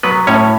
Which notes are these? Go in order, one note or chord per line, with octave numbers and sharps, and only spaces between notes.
F#3 B3 B4
A2 C#4 C#5